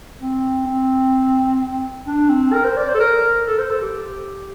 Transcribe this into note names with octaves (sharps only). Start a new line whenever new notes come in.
C4
C4
D4
C4
A#4
C5
D5
C5
A4
A#4
A4
C5
A4
G4